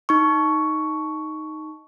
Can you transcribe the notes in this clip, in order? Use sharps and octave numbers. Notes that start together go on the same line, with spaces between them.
D#4 C#6